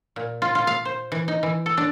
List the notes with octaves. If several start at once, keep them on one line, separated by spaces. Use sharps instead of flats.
A#2
F4
F4
F5
C5
E3
D#4
E3
A4
D4